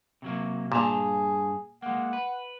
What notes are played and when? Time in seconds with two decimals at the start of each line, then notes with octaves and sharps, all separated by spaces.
0.22 C3 F#3 A#3
0.72 G2 A#2 G#4 A5 A#5
1.82 G#3 A#3 F#5
2.13 B4